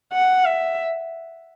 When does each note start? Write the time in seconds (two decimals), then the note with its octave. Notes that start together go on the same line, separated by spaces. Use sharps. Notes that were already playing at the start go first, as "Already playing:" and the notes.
0.13 F#5
0.45 E5